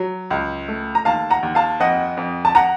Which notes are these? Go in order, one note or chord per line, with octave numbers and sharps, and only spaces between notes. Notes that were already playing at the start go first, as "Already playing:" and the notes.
Already playing: F#3
C#2
A3
A#5
D#2 F5 A5
F#5 A#5
D#2
F5 A5
F2 D#5 F#5
F2
A5
F#5 A#5